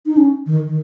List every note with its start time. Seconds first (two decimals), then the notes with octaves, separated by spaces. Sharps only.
0.06 D#4
0.17 C#4
0.46 D#3
0.67 D#3